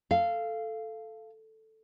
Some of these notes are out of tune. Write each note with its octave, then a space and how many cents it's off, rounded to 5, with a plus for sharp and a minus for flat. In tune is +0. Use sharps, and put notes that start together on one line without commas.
A4 +0 F5 -15